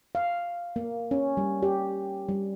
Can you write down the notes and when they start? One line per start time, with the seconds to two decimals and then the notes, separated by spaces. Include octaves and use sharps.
0.15 F5
0.76 A#3
1.11 C#4
1.37 G3
1.63 G4
2.28 G3